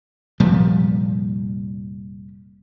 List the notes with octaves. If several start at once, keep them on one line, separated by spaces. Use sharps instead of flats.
F1 A#2 F3 G3